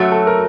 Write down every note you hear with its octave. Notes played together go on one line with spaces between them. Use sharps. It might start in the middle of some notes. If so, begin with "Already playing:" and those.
Already playing: F#2 F#3 A3 F#4
A4
A#4